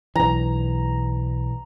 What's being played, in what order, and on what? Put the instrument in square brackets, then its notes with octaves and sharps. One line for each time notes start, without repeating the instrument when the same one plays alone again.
[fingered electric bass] B1 E3 [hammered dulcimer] A#5